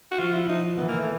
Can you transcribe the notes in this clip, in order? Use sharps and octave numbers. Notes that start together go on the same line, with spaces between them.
F#4
F3 F4
E4
F3 D#4
E3 B3
A#3
A3